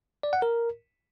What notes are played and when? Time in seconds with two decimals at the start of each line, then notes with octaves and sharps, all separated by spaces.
0.23 D5
0.33 F#5
0.42 A#4